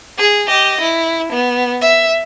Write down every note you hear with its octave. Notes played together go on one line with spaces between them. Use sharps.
G#4
G4 D#5
E4
B3
E5